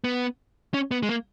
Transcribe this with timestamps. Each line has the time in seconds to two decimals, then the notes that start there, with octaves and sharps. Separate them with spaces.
0.04 B3
0.74 C#4
0.91 B3
1.03 G#3
1.09 A#3